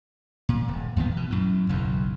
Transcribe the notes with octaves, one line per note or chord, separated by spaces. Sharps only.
A#2
D#1
E2 A#2 D#3 B3
B2
F#2 A2
F#1 B1 E2